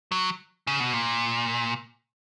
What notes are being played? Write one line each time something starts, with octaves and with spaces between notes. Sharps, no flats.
F#3
C#3
B2
A#2